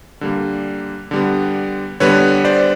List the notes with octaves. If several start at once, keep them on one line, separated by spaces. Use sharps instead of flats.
D3 G3 A#3
D3 G3 B3
D3 G3 B3 B4 C#5
C5 D5